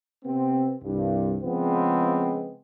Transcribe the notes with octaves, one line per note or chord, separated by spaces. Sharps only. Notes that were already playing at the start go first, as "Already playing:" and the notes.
C3 B3 C4
C2 G2
C#3 F3 G#3 B3 C4